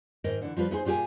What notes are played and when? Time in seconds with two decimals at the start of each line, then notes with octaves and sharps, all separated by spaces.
0.24 G#2 D#3 A#4 D#5
0.42 D3 E3
0.57 F3 G3 F4 B4
0.71 D#4 E4 G#4 C5
0.85 A#2 F4 G4 G#4 G#5